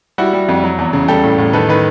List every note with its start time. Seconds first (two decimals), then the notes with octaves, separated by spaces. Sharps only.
0.18 G3 E4 F#4
0.33 G3
0.49 F2
0.63 F#3
0.78 E2
0.93 C#3
1.08 G3 G4 A4
1.24 A2
1.38 A2
1.53 D#3 A4 B4
1.69 D#3 B4